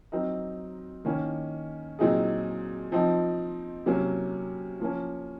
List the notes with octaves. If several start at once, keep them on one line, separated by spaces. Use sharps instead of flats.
F#3 C4 D#4 A#4
D#3 A#3 C#4
A#2 F#3 C4 D#4 G#4
F3 C4 D#4
C3 F#3 A#3 C#4
F3 A#3 C#4